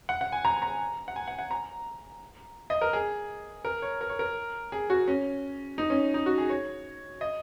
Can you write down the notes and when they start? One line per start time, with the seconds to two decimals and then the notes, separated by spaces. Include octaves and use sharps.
0.09 F#5
0.21 F#5
0.32 G#5
0.45 A#5
0.62 A#5
1.08 F#5
1.16 G#5
1.28 F#5
1.39 F#5
1.51 A#5
2.70 D#5
2.81 A#4
2.93 G#4
3.65 A#4
3.82 C#5
4.01 A#4
4.09 C#5
4.19 A#4
4.72 G#4
4.90 F#4
5.08 C#4
5.78 D#4
5.90 C#4
6.14 D#4
6.26 F#4
6.38 G#4
6.50 C#5
7.21 D#5